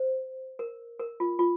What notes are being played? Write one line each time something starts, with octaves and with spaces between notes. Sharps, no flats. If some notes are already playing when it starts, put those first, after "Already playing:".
Already playing: C5
A#4
A#4
F4
F4